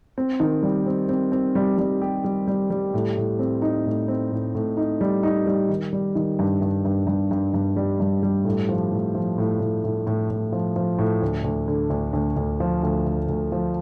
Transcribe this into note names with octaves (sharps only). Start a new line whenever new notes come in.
C4
D#3
G3
C4
C4
C4
G3
G3
G4
G3
G3
G3
A2
A2
C4
D#4
A2
C4
A2
A2
D#4
G3
D#4
G3
D#3
G3
D#3
G2
G2
G2
G2
G2
G2
G3
G2
G3
A2
F3
A2
F3
A2
A2
A2
A2
A2
F3
F3
A2
D2
D2
D3
D2
D2
D2
F3
D2
D2
D2
F3